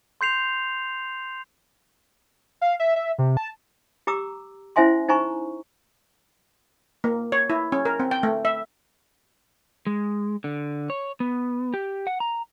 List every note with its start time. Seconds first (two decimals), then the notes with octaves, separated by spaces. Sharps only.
0.21 C6 G6 C7 F7
2.61 F5
2.80 E5
2.96 E5
3.18 C3
3.37 A5
4.07 G4 A#5 D6 E6
4.76 C#4 E4 C5 E5 G#5 C6
5.08 D#4 C5 G#5 A#5 C#6
7.04 A#3
7.32 C#5
7.50 E4
7.72 C#4
7.85 A#4
8.00 C4
8.11 G5
8.23 A3
8.45 E5
9.87 G#3
10.44 D3
10.90 C#5
11.20 B3
11.74 G4
12.07 F#5
12.20 A#5